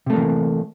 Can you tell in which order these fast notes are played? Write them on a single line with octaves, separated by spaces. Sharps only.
C3 A3 A#3 E3